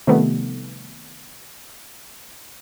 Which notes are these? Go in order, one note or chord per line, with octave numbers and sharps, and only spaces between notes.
C3 D#3 F3 G3 A3 B3